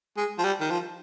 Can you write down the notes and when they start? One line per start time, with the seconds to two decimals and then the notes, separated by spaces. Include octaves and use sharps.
0.17 G#3
0.38 F3
0.44 G3
0.61 D#3
0.70 F3